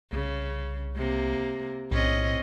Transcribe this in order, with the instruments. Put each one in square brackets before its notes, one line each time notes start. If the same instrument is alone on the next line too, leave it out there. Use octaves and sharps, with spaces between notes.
[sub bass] C2 [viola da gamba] C#3
[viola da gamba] C3 A#3
[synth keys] B1 [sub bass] A2 [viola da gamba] C4 C#4 D#5